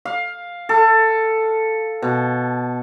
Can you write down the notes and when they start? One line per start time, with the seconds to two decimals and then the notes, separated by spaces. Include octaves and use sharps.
0.05 F5
0.69 A4
2.02 B2